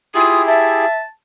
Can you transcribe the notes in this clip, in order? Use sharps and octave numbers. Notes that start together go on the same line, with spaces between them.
E4 F4 G4 G#4 D#6
E5 A5